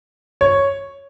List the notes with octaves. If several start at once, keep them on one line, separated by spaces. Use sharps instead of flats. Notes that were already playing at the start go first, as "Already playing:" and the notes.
C#5